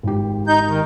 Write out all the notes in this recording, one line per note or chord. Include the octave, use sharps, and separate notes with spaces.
G#1 G4
D#4 G6
D#3